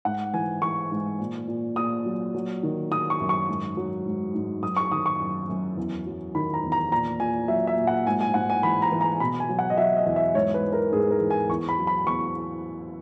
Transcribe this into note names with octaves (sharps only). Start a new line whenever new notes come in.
G#2 F#5
E3 G#5
E3 C#6
G#2
A#2
A#2
A#2 D#6
F#3
F#3
D#3
D#3 D#6
C#6
F#2
C#6
G#2
F#3
G#2
G#2
F#2 D#6
C#6
D#3 D#6
C#6
F#2
F#2
E2
F#3
D#3 B5
A#5
E2
A#5
A#2 A#5
A#2 G#5
F#3 E5
E5
A#2
F#5
G#2 G#5
G#5
G#2 F#5
G#5
E3 B5
A#5
E3
A#5
B2 B5
G#5
F#3
F#5
D#5
F#3 E5
D#5
E2
E5
G#2 C#5
B4
E3
A#4
G#2 G#4
A#4
E3
G#5
E2 C#6
B5
F#3
B5
E2 C#6